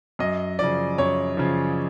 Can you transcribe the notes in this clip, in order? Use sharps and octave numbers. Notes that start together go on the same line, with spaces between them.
F#2 D#5
C#3 F3 D5
F#2 C#5
C#3 F3